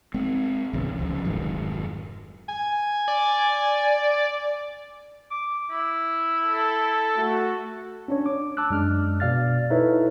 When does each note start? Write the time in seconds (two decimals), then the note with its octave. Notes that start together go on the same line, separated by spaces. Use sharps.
0.14 G#3 C4
0.73 A#1 E2 C#3
0.98 D1 C#2 F3 C#4
1.25 F1 G#2 D#3 F#3
2.49 G#5
3.08 D5
5.30 D6
5.70 E4
6.43 A4
7.18 A3 F#4
8.08 C#4 D4 C#5
8.26 D6
8.57 A5 D6 E6 F#6
8.70 F#2 G#3 D4 F6
9.20 B2 D5 F5 F6 A6
9.70 D#4 E4 A4 B4 C#5 E5